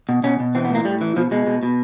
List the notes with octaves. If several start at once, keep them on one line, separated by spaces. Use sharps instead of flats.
B2
B2 C#4
B2
E3 C4
B3
A2 A#3
A2 G3
E3
B2 F3
B2 G#3
B2
B2